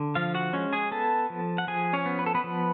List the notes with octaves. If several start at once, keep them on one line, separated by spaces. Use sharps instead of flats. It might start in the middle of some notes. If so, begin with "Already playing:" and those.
Already playing: D3
F3 F4 F5
F#4 F#5
G#3 C#4 C#5
G#4 G#5
B3 A4 A5
F3
F#5
F3 G#4 G#5
C#4 C#5
B3
B4
A4
B3 B4
F3